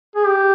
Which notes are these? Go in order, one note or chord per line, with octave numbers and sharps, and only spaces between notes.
G#4
G4